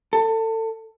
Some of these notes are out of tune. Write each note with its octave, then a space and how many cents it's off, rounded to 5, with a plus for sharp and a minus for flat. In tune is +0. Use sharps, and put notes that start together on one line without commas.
A4 +25